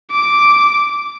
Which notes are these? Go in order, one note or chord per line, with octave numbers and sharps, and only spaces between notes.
D6